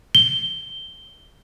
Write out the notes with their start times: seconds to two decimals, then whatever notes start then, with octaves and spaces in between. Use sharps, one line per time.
0.15 G7